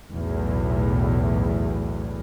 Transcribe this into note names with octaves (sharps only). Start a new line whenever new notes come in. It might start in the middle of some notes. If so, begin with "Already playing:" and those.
B1 E2 A2